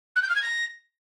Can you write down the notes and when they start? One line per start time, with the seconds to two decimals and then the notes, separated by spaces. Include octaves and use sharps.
0.15 F#6
0.22 G6
0.29 F6
0.35 G#6
0.42 A#6